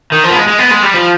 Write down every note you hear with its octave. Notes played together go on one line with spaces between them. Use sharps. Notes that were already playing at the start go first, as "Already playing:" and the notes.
D#3
F3
B3
G#3
G#3
B3
G#3
G3
F3